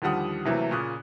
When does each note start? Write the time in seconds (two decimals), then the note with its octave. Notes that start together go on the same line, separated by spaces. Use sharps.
0.02 D#2 D3 F3 G3 F#5 D#6
0.45 C3 E3 F#3 A3 A#3
0.71 A#2 C#3 C#6 D#6 F#6